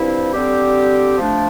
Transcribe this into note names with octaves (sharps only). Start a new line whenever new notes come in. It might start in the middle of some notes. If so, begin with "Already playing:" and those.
Already playing: G2 F3 C4 E4
D3 G3 C4 G4
F3 A3 D4